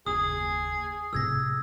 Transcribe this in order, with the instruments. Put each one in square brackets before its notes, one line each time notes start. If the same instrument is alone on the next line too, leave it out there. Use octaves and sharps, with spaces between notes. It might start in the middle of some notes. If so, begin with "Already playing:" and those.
[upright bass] F#1 D#2 [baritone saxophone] G#4 [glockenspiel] D#6
[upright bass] A2 C3 [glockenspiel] E6 G#6 A#6